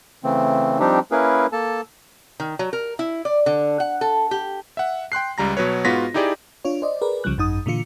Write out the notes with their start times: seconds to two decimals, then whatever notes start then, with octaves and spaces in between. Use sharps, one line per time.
0.24 C#3 E3 A3 C4
0.79 F3 G3 C4 D4 D#4 G4
1.11 A#3 C#4 E4 G#4 A#4 B4
1.52 A#3 A4 A5
2.40 D#3
2.59 F#3
2.73 A#4
2.99 E4
3.25 D5
3.46 D3
3.80 F#5
4.01 A4
4.31 G4
4.77 E5 F#5
5.12 G5 C6 F#6 C7
5.38 C#2 G3 A#5 A#6
5.57 B2 F#3 B4 C#5
5.85 G#2 B3 F4 F#4 A#6 B6
6.14 D#4 E4 G4 G#4 D5
6.65 D4 F4 C#5
6.82 C5 D5 D#5
7.01 G#4 A#4 B4 D5
7.24 C2 C#3 F3 G3 F#6
7.38 G#1 F#2 D#4 D#6
7.66 A#2 D3 E3 F4 C#7